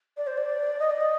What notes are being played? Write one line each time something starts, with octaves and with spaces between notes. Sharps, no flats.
D5
C5
D5
D#5
D5
D#5